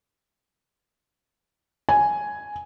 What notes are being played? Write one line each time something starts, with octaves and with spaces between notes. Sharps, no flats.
G#5